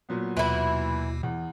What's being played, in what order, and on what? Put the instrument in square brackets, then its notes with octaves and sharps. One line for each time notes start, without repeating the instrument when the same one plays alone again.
[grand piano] A#2 F#3 B3
[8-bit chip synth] D#2 B2 [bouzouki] E3 E4
[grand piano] E2